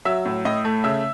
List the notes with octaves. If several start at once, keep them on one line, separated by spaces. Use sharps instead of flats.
F#3 E5 E6
A2
A2 D#5 D#6
A3
C#3 E5 E6